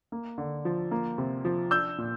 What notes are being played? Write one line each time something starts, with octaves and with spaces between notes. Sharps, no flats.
A#3
D3
F3
A#3
C3
F3
D4 E6 G6
A#2